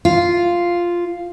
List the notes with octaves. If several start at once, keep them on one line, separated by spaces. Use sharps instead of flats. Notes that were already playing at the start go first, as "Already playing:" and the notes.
F4